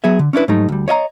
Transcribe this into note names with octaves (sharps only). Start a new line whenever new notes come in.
F#3 B3 G#4 E5
D3
C#4 D4 E4 B4
G#2 F#3 G3 A3 D#4
D2 G3
C#5 D#5 E5 A#5